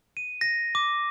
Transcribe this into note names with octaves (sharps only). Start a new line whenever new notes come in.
D#7
A#6
D6